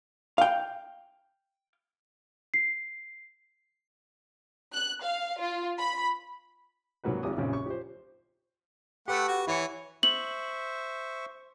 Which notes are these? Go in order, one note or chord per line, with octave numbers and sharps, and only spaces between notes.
F5 G5
C7
F#6
F5
F4
B5
C2 G#2 F#3 A#3 F#4 B4
G#1 G3 D6 D#6
A#1 F#2 C#3 C4 G4
C#6
G4 C5
A3 G4 B4 F#5
F#4
E3 E4 C#5 C#7
C5 E5 C#6 F#7